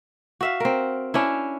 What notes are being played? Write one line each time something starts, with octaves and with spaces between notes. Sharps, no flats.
F#4 E5 F5
C4 A#4
C#4 D4 E4